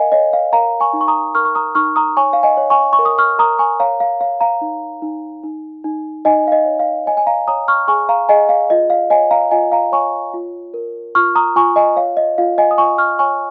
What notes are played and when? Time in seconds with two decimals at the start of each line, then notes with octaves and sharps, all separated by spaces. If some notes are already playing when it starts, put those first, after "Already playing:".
Already playing: A#4 D#5 F5 G#5
0.12 C#5 D#5
0.33 F5
0.53 A#4 F5 A#5
0.80 G#5 C#6
0.93 D#4
1.01 C#6
1.08 A#5 D#6
1.35 A#4 C#6 F6
1.45 C#6
1.55 A#5 D#6
1.75 D#4 C#6 F6
1.96 A#5 D#6
2.17 C#5 G#5 C#6
2.33 F5
2.43 D#5 G#5
2.57 C#5
2.70 G#5 C#6
2.93 C#6
2.99 A#4
3.05 D#6
3.18 C#6 F6
3.38 A#4 A#5 D#6
3.59 G#5 C#6
3.80 C#5 F5 A#5
4.00 F5
4.21 C#5 F5
4.41 F5 A#5
4.61 D#4
5.02 D#4
5.44 D#4
5.84 D#4
6.25 D#4 D#5 G#5
6.47 F5
6.52 D#5
6.65 C#5
6.80 F5
7.06 C#5 D#5 G#5
7.17 G#5
7.27 F5 A#5
7.47 C#5 A#5 D#6
7.68 C#6 F6
7.88 G#4 G#5 C#6
8.09 F5 A#5
8.29 G#4 D#5 G#5
8.49 F5
8.70 F4 D#5
8.90 F5
9.10 C#5 D#5 G#5
9.31 F5 A#5
9.51 F4 D#5 G#5
9.72 F5 A#5
9.92 C#5 G#5 C#6
10.34 F4
10.74 A#4
11.15 F4 C#6 F6
11.36 A#5 D#6
11.56 F4 G#5 C#6
11.76 D#5 G#5
11.96 C#5 F5
12.17 D#5
12.38 F4 F5
12.58 D#5 G#5
12.71 D#6
12.78 F4 G#5 C#6
12.98 C#6 F6
13.19 C#5 G#5 C#6